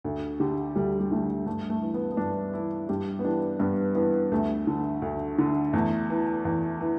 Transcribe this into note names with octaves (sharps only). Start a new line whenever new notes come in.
D2
D3 G4
D2 G3
G3
D3 A3
G2 A3
A3
E3
B3
B3
G2 D4
E3 E4
G2 G4
B3
E3 D4
G2 B3
E3 B3
D2 A3
D3
D2
D3
E2 A3
E3
E2
E3